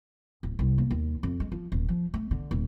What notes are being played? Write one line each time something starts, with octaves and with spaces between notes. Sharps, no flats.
D1
C2
A#3
D#2
F2
G#3
F3
D#1
F3
A3
D3
D#1